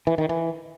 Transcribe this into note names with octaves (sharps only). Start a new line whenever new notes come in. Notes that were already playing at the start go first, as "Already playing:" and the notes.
E3
D#3
E3